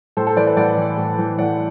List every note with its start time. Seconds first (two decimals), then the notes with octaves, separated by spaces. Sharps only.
0.17 A2 A4 C5
0.27 A4 C5
0.36 E3 B4 D5
0.47 B4 D5
0.57 A2 D5 F#5
0.77 E3
0.98 A2
1.18 E3
1.38 A2 D5 F#5